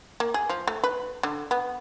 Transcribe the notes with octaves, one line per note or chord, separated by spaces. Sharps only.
A#3
G#4
F3
A3
B4
D3
B3